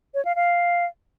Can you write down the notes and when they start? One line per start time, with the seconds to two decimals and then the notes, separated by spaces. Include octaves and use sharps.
0.14 C#5
0.25 F5
0.36 F5